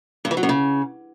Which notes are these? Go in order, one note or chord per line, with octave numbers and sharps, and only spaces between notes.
G2
E3
F#3
F#2
C#3